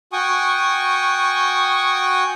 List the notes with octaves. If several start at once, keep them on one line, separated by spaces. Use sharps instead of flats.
F#4 G5 G#5 C#6 D#6